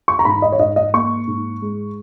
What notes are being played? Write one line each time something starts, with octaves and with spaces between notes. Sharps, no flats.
C#6
A#5
G#2 B5
D#5
C#5
G#2 D#5
D#5
A#3 C#6
G#2
G#3